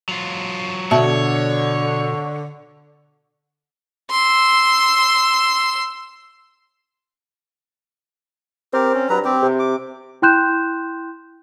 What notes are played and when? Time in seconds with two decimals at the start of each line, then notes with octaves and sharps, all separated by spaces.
0.09 F#3 F4
0.91 B2 D3 F#4 C#5 E5 A5
4.11 C6 E6
8.73 C4 G4 A#4
8.94 C#4
9.10 G2 F#3 B4 A#5
9.25 C4 G4
9.42 C3
9.59 D6
10.22 E4 G5 C6 F#6 G6 E7